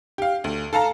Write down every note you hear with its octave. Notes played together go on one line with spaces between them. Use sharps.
G4 F5
D2
A4 F5 A5 A#5